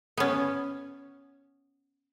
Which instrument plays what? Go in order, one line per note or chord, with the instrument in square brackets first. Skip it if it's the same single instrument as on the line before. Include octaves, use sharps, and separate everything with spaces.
[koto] B3 C#4